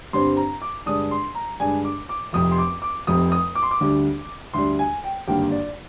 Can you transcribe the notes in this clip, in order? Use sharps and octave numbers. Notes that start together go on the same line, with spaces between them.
G2 D3 G3 C4 C6
A#5
D6
G2 D3 G#3 D4 D#6
C6
A#5
G2 D3 G#3 D4 G#5
D6
D6
F1 F2 C3 D#6
C6
D6
D6
F1 F2 C3 D#6
D#6
D6
C6
D6
D2 D3 G3
D2 D3 G3 C6
G#5
G5
G#1 G2 D3 G3 A#3 G5
D5